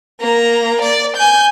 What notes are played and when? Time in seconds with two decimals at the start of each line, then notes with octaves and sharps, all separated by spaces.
0.20 A#3 A#5
0.82 D5
1.17 G#5 G6